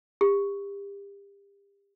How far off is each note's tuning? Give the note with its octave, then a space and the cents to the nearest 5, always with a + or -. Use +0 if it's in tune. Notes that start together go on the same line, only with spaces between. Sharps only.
G4 +35